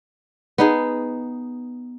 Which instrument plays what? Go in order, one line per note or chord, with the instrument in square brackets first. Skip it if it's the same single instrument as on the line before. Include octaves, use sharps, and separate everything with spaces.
[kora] B3 D#4 G#4